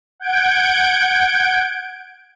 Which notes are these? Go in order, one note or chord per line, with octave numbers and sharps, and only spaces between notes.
F#5 G6 G#6 D7